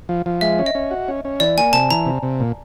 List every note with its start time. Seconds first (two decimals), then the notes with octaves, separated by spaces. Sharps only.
0.09 F3
0.26 F3
0.41 G#3 E5
0.59 C#4
0.66 D#5
0.75 C#4
0.91 F#4
1.08 C#4
1.25 C#4
1.40 E3 D5
1.57 A#3 G#5
1.73 C3 A5
1.91 E3 A#5
2.06 C3
2.23 C3
2.40 A#2